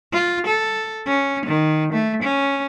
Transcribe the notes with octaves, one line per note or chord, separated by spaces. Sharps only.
F4
A4
C#4
D#3
A3
C#4